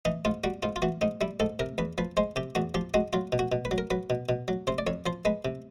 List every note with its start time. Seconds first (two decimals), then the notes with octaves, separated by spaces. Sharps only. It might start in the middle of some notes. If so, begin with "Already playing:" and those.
0.05 E3 D#4
0.25 G#2 F4
0.44 G3 F#4
0.63 G#2 F4
0.76 F4
0.82 E3 F#4
1.01 G#2 D#4
1.21 G3 E4
1.40 G#2 A4
1.59 C3 A#4
1.78 E2 B4
1.98 F3 B4
2.17 G#3 C5
2.36 C3 G4
2.55 E2 F#4
2.74 F3 G4
2.94 G#3 F#4
3.13 F#3 F4
3.32 B2
3.39 F#4
3.52 B2
3.65 B4
3.71 F#3
3.78 A#4
3.90 F#3 B4
4.10 B2
4.29 B2
4.48 F#3
4.67 C3 C5
4.78 D5
4.87 F2 C#5
5.06 F3 C5
5.25 G#3 B4
5.45 C3